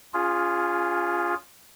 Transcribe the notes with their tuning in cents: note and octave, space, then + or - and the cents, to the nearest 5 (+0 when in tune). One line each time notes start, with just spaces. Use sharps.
C#4 +25 F4 +0 G#4 -10